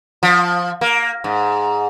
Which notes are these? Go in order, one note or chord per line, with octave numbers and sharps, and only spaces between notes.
F3
A#3
G#2